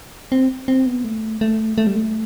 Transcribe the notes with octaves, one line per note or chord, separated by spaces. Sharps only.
C4
C4
B3
A3
A3
A3
G3
A3